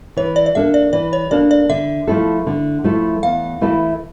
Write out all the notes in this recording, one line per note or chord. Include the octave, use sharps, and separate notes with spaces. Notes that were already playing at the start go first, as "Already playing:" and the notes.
E3 C#5
D5
D5
A#3 D4 A4 E5
D5
E3 D5
C#5
A#3 D4 A4 D5
D5
D3 E5
F3 A3 E4 A4
D3
F3 A3 E4 A4
E2 F5
E3 A3 E4 A4